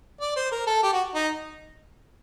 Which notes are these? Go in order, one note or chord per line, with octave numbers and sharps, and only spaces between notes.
D5
C5
A#4
A4
G4
F#4
D#4